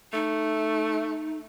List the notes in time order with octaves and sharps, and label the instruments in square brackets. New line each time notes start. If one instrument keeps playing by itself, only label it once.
[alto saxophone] A3 [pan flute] D#4